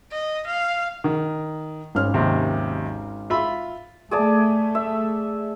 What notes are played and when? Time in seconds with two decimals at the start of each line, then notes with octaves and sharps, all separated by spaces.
0.11 D#5
0.47 F5
1.04 D#3
1.95 G#1 C#4 F6
2.14 D#2 C3
3.30 F4 E5 B5
4.11 A3 G#4 D5 A5
4.75 E5